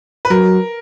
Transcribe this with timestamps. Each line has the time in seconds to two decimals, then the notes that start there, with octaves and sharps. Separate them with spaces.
0.25 B4
0.30 F#3 A#4